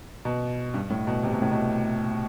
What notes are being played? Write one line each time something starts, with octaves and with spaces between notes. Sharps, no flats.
B2
G2
A2
B2
C3
B2
A2
B2